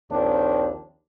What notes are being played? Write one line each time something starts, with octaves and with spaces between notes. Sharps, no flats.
A#1 D#2 C4 D4